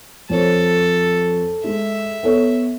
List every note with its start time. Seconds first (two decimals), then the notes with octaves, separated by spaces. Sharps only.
0.30 F2 A4 C#5
1.64 G#3 E5
2.23 B3 A4 C#5